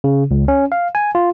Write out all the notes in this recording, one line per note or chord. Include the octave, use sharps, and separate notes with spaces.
C#3
C#2
C#4
F5
G#5
F4